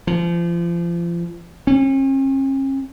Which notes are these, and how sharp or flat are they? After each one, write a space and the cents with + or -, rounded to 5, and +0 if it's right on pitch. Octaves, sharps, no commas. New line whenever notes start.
F3 -35
C#4 -45